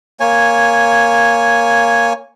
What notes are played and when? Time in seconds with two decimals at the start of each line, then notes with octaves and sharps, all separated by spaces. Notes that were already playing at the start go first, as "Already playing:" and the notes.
0.20 A#3 C#5 G#5